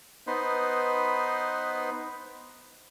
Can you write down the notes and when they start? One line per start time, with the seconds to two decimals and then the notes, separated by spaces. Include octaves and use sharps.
0.27 B3 D#4 B4 C5